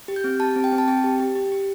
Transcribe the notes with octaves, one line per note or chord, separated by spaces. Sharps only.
G4
G6
C4
G4 A5
C4
G5
C4
A5
C4 G5
G4
G4
G4
G4